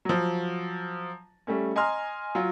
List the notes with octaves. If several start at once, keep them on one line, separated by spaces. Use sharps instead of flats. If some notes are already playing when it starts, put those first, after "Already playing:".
F3 F#3
G3 A3 C#4
D#5 G#5 A#5 C6 F6
F#3 F4